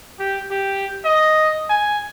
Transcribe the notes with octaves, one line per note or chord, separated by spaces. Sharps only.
G4
G4
D#5
G#5